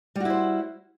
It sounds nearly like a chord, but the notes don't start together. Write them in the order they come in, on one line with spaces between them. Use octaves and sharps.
G3 F#4 E4 C5